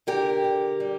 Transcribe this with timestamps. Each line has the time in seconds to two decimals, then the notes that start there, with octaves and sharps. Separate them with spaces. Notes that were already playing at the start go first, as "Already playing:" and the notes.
0.07 D3 G4 A#4
0.44 D3
0.80 G3